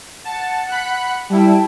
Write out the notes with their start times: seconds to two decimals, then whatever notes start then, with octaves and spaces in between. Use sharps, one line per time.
0.25 F#5 A5
0.69 B5 F#6
1.30 G3 E4 G5 A5